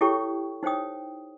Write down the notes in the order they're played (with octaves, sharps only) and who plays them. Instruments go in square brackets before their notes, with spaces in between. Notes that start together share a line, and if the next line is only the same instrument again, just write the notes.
[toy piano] E4 G4 A4 C#5 G5 C#6
D#4 C5 C#5 G5 D#6